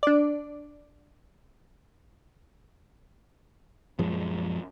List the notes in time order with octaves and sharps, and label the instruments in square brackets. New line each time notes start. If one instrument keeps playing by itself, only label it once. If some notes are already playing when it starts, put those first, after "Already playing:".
[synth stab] D4 D5
[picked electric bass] A#1 F#2 F3 G#3